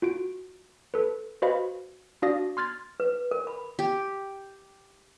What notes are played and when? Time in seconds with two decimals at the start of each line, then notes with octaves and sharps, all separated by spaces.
0.02 F4 F#4 D7
0.94 A4 B4
1.42 F#4 B4 C5 D#5 F5 B5
2.22 D4 F#4 D5 F5 D#6 A#6
2.57 C6 F6 G#6 A6
3.00 B4
3.31 A#4
3.47 B5
3.79 G4